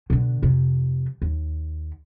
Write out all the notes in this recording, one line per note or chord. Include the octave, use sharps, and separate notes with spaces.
B2 D3
F2 C3
D#2